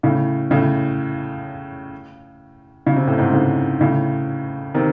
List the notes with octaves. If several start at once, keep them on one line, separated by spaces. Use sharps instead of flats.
A2 C#3
A2 C#3
C#3
C3
A2
G#2 C3
A2 C#3
A2 C#3
C3 D#3